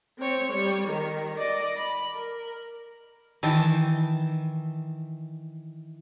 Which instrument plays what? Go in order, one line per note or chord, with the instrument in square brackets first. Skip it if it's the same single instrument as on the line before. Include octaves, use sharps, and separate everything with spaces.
[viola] C4 C#5
G3 C#5
D#3
D5 D#5
B5
A#4
[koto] D#3 E3 E5 A5